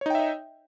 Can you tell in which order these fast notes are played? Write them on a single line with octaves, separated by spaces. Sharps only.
C#5 D#4 G5 E5 D#5